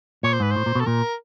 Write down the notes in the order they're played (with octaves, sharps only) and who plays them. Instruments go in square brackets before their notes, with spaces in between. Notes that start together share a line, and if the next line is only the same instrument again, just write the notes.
[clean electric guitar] A#2 [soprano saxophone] C#5
[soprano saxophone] C5
[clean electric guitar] G#2 [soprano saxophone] B4
[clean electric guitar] A2 [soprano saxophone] C5
[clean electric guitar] A#2
B2
[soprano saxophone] A4
[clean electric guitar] A#2 [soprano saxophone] A#4